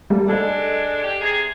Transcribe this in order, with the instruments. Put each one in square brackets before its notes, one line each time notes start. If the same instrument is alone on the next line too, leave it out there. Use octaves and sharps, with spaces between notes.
[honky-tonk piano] G3 A3 A#3
[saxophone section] G#3 D4 [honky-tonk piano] A4 D#5
[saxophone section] G4
C3 G#4